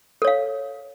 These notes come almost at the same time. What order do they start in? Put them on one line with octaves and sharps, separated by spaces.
A4 C#5 F5